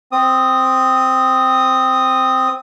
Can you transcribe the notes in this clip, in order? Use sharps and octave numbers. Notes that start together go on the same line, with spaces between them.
C4 D#6